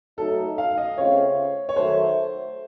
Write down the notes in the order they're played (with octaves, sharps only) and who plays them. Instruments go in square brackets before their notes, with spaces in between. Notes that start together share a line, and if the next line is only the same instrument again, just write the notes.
[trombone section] F#3 A3 D#4 [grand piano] A4
[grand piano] F5
D#5
[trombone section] C#3 A3 C4 F4 [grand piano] C#5
[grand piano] C#5
[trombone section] D#3 F#3 A3 [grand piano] C5